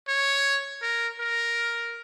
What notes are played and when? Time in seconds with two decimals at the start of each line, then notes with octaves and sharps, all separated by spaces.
0.08 C#5
0.82 A#4
1.19 A#4